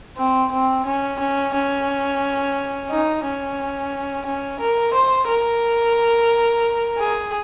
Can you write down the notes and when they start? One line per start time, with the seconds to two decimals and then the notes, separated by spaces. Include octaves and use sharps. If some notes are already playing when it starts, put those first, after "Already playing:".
0.17 C4
0.52 C4
0.86 C#4
1.19 C#4
1.54 C#4
2.91 D#4
3.24 C#4
4.26 C#4
4.60 A#4
4.94 C5
5.28 A#4
6.98 G#4